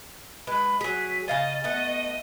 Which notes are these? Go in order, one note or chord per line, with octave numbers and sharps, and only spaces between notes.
G#3 B4 B5
F#3 G#4 B6
C#3 D#5 F5 G#5 A6
A3 B3 D#5